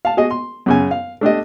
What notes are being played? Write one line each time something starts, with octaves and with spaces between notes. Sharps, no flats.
F5 A5
F#4 G#4 D#5
C6
F#2 C#3 G#5
F5
A3 D4 G4 D#5